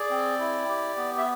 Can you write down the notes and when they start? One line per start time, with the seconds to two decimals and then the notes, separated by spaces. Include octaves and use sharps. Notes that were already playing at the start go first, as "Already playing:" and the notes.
Already playing: G#4 D5
0.10 C4
0.39 E4
0.69 G4
0.97 B3
1.17 E5